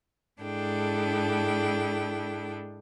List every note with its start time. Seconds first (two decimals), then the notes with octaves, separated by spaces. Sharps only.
0.41 G#2 D4 E4 G#4 A4 G5